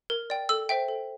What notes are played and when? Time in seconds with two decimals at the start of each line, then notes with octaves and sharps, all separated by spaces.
0.10 A#4
0.30 D5 G5
0.49 A4 E6
0.69 C5 E5 G5
0.88 A4